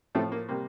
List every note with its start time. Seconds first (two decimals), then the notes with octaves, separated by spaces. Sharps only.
0.15 A2 F3 A3 C4
0.32 A#3
0.49 C3 G3 A#3